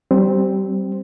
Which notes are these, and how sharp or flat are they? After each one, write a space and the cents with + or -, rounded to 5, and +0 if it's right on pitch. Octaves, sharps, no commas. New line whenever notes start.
G3 -25 C4 +0